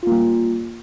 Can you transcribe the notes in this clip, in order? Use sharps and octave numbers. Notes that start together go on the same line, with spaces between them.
G3 A#3 F4